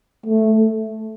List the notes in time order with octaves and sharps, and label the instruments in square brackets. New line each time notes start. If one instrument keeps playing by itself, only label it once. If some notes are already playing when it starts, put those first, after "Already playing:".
[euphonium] A3